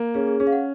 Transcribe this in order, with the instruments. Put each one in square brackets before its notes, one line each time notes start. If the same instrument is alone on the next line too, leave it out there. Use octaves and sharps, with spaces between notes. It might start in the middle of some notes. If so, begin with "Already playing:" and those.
Already playing: [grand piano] A#3
[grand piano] C#4 [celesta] G#4
[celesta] G#4
[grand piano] C#4 [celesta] G#4
[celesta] F5
F#5